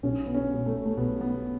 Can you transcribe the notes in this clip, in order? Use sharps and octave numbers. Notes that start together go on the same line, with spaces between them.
B1 C#4
B3
C#4
B2 G#3
A3
A3
B1 B3
B3